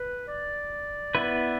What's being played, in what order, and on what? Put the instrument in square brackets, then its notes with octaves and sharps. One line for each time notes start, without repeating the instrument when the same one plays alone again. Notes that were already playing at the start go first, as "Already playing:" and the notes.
Already playing: [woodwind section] B4
D5
[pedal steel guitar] B3 E4 B4